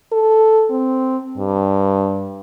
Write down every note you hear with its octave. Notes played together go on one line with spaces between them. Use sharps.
A4
C4
G2